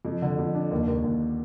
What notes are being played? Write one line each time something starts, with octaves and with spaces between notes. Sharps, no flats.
F2
D3
F2
D4
D#2
D#2
D#2